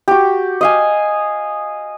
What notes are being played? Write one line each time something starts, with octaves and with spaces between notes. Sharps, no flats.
F#4 G4
D#5 F5 G#5